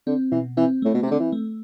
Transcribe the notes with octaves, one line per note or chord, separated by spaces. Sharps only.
D3 C4
B2 E3
E3 C4
A2 A3
B2
C3
D3 C4
E3
A3